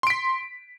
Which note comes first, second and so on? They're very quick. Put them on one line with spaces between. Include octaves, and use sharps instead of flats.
C6 D7 B6